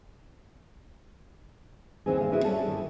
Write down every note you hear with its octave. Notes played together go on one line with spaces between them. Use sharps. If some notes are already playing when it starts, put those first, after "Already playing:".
D#2 D#3 E3 C4 D#4 G#4
G3 C5 F5
E4 F#4 G#4 B4
G3 C#4 A4 A5
D#3 E4